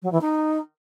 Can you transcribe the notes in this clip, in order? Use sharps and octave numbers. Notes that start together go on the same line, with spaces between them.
F#3
E3
D#4